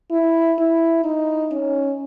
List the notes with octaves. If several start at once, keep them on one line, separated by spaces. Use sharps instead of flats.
E4
E4
D#4
C#4